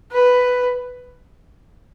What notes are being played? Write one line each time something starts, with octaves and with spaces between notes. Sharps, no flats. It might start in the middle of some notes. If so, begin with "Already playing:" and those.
B4